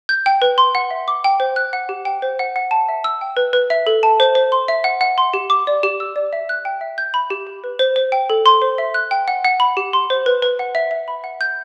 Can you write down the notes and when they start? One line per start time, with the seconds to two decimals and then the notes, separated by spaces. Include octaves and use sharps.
0.09 G6
0.26 G5
0.42 B4
0.58 C6
0.75 F#5
0.91 E5
1.08 D6
1.24 G5
1.40 C5
1.56 F#6
1.73 F#5
1.89 G4
2.05 G5
2.22 C5
2.39 F#5
2.56 F#5
2.71 A5
2.89 E5
3.04 E6
3.21 G5
3.37 B4
3.53 B4
3.70 E5
3.87 A4
4.03 A5
4.20 C5
4.35 C5
4.52 C6
4.68 E5
4.84 F#5
5.01 F#5
5.18 C6
5.34 G4
5.50 D6
5.67 D5
5.83 G4
6.00 E6
6.16 D5
6.33 E5
6.49 F#6
6.65 G5
6.81 E5
6.98 G6
7.14 B5
7.30 G4
7.47 G4
7.64 B4
7.79 C5
7.96 C5
8.12 G5
8.30 A4
8.46 C6
8.62 C5
8.78 E5
8.94 F#6
9.11 G5
9.28 F#5
9.45 F#5
9.60 B5
9.77 G4
9.93 C6
10.10 C5
10.26 B4
10.42 B4
10.59 F#5
10.75 E5
10.91 E5
11.08 B5
11.24 F#5
11.41 G6